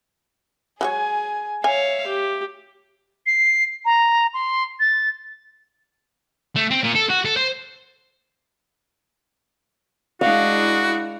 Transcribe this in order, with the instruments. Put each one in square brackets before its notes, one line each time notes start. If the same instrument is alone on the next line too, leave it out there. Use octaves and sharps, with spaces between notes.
[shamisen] F#3 G#3 C#5 [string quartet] G#4 G#5
[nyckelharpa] C#5 F5 [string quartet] E5 [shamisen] G#5
[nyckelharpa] G4
[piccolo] C7
A#5
C6
A6
[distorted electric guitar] A3
C4
A#2
A4
F#4
A4
C5
[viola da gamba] G#3 D4 [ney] E4 [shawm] F#4 [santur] F5